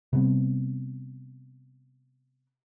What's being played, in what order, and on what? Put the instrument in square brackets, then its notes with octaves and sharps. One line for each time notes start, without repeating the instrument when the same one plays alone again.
[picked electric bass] C3 G3 B3 C4